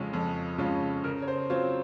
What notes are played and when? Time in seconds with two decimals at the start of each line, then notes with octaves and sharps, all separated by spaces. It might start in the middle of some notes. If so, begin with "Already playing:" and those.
Already playing: F2 C#3 G#3 C#4 F4
0.13 F2
0.58 C#3 G#3 C#4 F4
1.04 C#3 A#4
1.22 C#5
1.28 C5
1.50 F#3 C4 F4 C#5